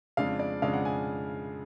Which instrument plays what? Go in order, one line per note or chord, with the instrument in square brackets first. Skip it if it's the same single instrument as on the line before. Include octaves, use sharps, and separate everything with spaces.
[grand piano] F2 C#3 G#3 D4 F5
D5
F2 C#3 G#3 D4 F5
F#5
G#5